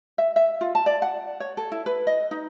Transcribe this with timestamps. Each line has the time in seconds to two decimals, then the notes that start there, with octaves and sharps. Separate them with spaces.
0.18 E5
0.36 E5
0.61 F4
0.75 A5
0.86 D5
1.02 F#5
1.40 C#5
1.57 A4
1.72 E4
1.86 B4
2.07 D#5
2.31 D#4